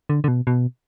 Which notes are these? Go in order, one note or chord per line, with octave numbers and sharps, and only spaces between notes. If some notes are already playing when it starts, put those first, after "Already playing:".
D3
D3
B2
B2